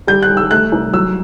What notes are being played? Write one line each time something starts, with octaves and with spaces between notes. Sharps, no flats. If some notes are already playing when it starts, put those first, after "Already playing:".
G3 G6
F#6
G3
E6
A3 F#6
C2
F#3 E6